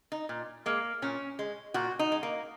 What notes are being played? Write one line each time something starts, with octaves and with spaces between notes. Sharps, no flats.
D#4
A#2
G#3 A#3
A#2 C#4
G#3
A#2 F#4
D#4
G#3
A#3